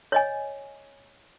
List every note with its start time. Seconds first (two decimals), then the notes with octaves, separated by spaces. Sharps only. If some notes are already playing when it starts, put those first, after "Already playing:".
0.12 C#5 D#5 G#5